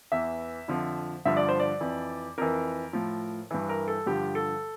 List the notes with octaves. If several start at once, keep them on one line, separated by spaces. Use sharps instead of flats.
E2 E3 E5
F2 D3 F3
G2 D3 F3 E5
D5
C5
D5
F2 E3
F2 E3 A#4
A2 F3
G2 E3
A#4
A4
G2 D3 F3 G4
A4